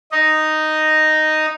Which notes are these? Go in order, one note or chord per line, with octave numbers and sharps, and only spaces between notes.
D#4 D#5